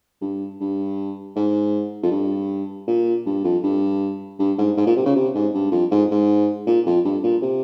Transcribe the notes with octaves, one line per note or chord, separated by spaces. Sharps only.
G2
G2
G#2
F2
G2
A#2
G2
F2
G2
G2
G#2
G#2
A#2
C3
C#3
C3
G#2
G2
F2
G#2
G#2
A#2
F2
G2
A#2
C3